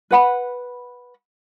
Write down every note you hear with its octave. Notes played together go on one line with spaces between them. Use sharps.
B4 F#5 B5